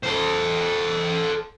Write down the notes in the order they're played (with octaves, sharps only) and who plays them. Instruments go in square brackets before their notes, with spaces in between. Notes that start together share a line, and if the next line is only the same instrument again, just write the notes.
[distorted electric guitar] A4 C5